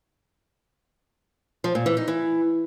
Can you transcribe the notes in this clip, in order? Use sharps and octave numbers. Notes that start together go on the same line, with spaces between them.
F3
A#2
E3
D#4
E3